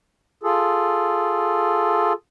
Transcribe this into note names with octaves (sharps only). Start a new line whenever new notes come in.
F4 G#4 A4